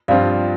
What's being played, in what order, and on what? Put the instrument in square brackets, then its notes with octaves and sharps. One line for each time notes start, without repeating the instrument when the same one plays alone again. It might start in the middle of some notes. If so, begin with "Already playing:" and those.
[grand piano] G2 F3 C4 F4 [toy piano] D5 F5